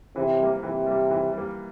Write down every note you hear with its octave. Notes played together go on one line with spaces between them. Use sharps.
C3 E3
G3 A#3
C3 E3
G3 A#3
E3
G3 A#3